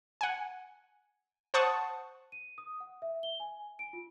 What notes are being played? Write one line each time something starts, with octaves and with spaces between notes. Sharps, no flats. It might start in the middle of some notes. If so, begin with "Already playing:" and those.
F#5 G#5
C5 F#5 A5 C#6 D#6
D#7
D#6
F#5
E5
G7
G#5
D7
F4